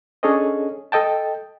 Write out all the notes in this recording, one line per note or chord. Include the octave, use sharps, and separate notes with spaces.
C#4 D4 G#4 A4 C#5 D#5
A4 D#5 G5 A5